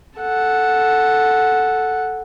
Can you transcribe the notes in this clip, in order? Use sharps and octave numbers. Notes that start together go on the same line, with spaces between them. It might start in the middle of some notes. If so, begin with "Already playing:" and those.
A4 F#5